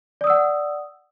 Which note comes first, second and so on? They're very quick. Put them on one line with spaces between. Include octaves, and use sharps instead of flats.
D5 D#6 E6 F#5